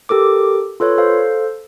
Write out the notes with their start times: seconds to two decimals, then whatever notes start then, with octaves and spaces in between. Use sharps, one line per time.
0.09 G4 A4 A#4 D6
0.80 F4 A4 B4 C#5
0.97 A4 C5 F5